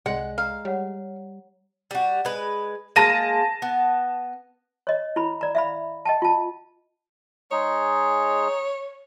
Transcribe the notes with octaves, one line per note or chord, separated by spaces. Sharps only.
C2 G#3 D5 F#5
F5 A#5
G3 C#5 F#5
G3 F#4
G#3 B4
G#3 A#3 A5 A#6 D#7
B3
C#5 D#5
E4 B5
D5 A#5
E5 F5 B5
D#5 G5 A5
F4 A5
G#3 D#4 G#4 C#5